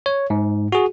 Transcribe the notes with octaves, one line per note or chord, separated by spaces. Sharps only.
C#5
G#2
F#4 G#4